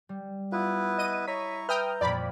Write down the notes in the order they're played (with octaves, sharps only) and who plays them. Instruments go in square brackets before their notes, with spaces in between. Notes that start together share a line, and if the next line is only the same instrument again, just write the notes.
[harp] G3
[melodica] B3 E4 B4 [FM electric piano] F4
[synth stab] D#5 D#7
[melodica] E4 A#5 C#6 [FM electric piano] C#5 B6
[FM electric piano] B4 E5 G6 [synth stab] G5 D#6 F6 [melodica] A#5
[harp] F2 A#2 [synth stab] D5 B5